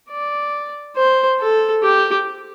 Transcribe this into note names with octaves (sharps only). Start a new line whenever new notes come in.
D5
C5
A4
G4